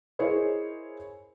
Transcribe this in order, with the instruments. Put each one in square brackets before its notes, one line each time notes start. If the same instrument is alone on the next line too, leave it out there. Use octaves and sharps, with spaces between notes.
[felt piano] E4 G#4 A#4 C5 C#5 D#5